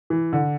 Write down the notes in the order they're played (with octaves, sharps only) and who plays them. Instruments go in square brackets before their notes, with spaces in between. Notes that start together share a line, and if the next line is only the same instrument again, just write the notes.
[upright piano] E3
D3